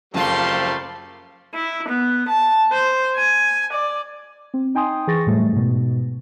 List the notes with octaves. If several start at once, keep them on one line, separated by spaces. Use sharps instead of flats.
F#1 F2 G3 A3 A#3 F4 A5 C6
E4
B3
A5
C5
G#5
D5
C4
D#4 G5 G#5 C6 D#6
E3 G#4 C6 C#6 A6 A#6
A2 F#3 G3 A3
G#2 B2